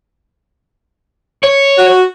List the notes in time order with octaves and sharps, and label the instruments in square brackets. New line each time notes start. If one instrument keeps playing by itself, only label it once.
[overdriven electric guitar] C#5
[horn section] F#4